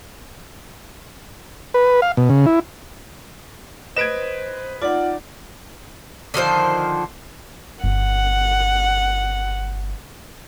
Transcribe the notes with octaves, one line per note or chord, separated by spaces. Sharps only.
B4
F5
B2
C#3
E4
B4 C5 D#5 G#6 D7 E7
D#4 F4 D5 F#5
D3 D#3 F3 C5
G1 F#5